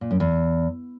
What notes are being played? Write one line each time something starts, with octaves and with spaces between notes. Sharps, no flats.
A#2
F#2
E2